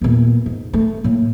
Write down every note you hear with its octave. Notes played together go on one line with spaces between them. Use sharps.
E2 A#2
G#2
A3
A2 A#3